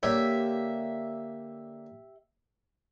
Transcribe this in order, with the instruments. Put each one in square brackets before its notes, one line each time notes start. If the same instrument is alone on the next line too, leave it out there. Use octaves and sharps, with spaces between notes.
[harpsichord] D3 A#3 C#5 [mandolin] G4 E5